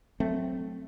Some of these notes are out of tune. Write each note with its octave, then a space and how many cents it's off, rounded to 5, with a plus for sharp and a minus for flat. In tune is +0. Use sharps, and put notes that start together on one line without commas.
F#3 +0 A3 +0 C4 +0